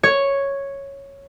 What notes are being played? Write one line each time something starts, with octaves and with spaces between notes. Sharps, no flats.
C#5